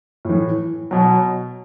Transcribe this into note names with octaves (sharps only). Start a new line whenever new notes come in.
A2 E3
B2 F#3